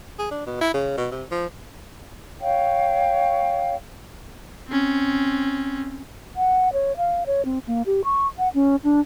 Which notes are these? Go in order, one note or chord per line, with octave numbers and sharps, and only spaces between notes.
G#4
D4
B2
E4
C#3
B2
C3
F3
C#5 F5 G5
C4 C#4
F#5
C#5
F5
C#5
C4
A#3
G4
C#6
F#5
C#4
D4